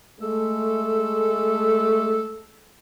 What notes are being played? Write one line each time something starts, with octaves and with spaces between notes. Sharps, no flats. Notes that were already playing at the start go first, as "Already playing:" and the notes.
G#3 A3 A4